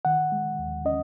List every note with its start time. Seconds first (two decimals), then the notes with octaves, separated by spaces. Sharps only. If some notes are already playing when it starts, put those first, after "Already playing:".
0.05 D#3 F#5
0.32 G#3
0.59 D#2
0.85 C#4 D#5